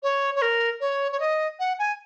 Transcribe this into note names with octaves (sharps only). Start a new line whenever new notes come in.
C#5
C#5
A#4
C#5
C#5
D#5
F#5
G#5